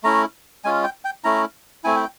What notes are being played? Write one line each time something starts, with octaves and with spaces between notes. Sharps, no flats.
A3 C#4 E4 A#5
G#3 C#4 F4 G#5
G5
G5
A3 C#4 E4 A#5
A3 C4 E4 G#5
G5